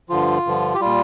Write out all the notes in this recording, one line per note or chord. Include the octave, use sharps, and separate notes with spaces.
G2 D3 F3 F4
G2 D3 F3
G4
A#2 G3 F4